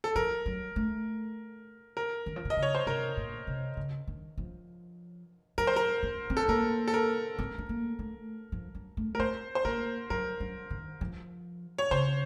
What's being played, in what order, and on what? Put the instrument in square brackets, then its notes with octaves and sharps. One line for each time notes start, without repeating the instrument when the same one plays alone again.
[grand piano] A4
[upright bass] F3 [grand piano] A#4
[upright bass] F#3
A3
[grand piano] A#4
[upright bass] D#3
F3
D#3
[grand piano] D#5
[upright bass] C#3
[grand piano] C#5
C5
[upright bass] C3 [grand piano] A#4
[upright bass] A#2
C3
C#3
D#3
F3
[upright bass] F#3 [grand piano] A#4
[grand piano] C5
A#4
[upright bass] C4
C4
[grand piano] A4
[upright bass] A#3 [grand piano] A#4
[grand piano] A4
A#4
[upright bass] C4
C4
A#3
A3
F3
F#3
A3
[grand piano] A#4
[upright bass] C4 [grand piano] C5
[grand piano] C5
[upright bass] A#3 [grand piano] A#4
[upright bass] F#3 [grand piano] A#4
[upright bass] F#3
D#3
F3
[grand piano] C#5
[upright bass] C#3 [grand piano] C5